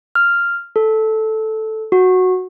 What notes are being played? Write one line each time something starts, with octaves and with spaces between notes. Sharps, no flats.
F6
A4
F#4